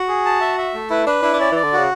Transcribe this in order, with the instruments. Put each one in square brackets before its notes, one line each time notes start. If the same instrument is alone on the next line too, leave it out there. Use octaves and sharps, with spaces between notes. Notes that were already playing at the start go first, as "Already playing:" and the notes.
Already playing: [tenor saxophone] F#4
[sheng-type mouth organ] G#4
A5
E5
E5
A3
[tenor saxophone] E4 [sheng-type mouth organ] B4
[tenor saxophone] D4 [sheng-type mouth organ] B4
[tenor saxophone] D4 [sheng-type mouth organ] E4
[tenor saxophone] D4
[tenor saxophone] C#4 [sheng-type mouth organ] D5
[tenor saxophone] E3 [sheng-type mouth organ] D5
[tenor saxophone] D3
[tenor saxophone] C#3 [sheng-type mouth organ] F#4